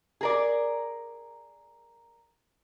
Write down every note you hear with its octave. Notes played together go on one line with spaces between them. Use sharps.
G#4 A#4 D5